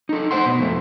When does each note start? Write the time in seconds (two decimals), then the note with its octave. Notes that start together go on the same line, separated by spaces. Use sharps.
0.09 D#4 A4
0.31 C5 F#5 C6
0.46 B2
0.60 F2 A3